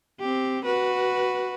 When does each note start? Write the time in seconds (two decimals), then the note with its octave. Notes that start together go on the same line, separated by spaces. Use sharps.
0.20 C4 G4
0.65 F#4 B4